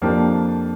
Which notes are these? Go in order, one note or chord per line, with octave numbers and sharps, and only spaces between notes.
F2 F3 A#3 D4 G4